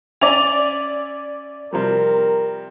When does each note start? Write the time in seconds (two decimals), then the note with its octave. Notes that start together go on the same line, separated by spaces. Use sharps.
0.21 C#4 D5 E5 G#5 F7
1.73 C3 F3 G3 A#4